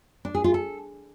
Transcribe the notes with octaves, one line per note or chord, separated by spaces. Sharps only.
D4
G#4
F4
A4